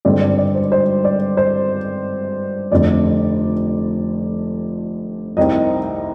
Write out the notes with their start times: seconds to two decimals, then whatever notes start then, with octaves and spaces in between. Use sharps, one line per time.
0.05 G#1 G2 D3 G#3 C4 D5
0.21 D5
0.38 D5
0.55 C5
0.72 C5
1.04 D5
1.37 C5
2.71 F1 F2 D3 D5
5.37 C2 C3 D#3 G3 C4 D#5